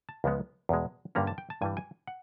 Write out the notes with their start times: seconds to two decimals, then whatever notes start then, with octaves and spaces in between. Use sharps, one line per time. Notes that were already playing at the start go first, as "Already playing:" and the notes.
0.09 A5
0.24 C#2 C#3 F3 G#3 B3
0.69 E2 B2 G#3
1.15 G2 D3 G3 A#3 C#4 A#5
1.27 A5
1.38 G5
1.50 A5
1.61 G2 E3 G3 G#5
1.77 G#5
2.07 F#5